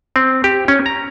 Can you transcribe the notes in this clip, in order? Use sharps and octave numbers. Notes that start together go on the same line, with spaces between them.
C4
G4
C#4
A#5